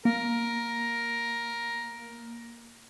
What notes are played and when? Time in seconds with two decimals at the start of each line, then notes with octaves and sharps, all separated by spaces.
0.05 A#3 A#4